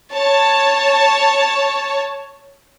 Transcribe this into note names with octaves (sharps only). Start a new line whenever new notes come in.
C#5 A5